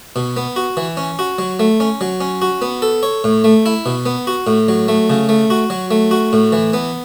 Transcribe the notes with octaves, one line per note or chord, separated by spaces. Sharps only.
B2
B3
F#4
E3
C#4
F#4
F#3
A3
C#4
F#3
C#4
F#4
B3
A4
C#5
A2
A3
E4
B2
B3
F#4
A2
F#3
A3
C#3
A3
F#4
F#3
A3
F#4
A2
E3
B3